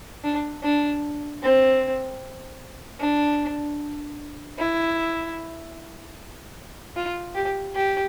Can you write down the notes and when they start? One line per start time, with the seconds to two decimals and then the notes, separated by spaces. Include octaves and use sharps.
0.24 D4
0.63 D4
1.42 C4
3.00 D4
4.58 E4
6.96 F4
7.35 G4
7.75 G4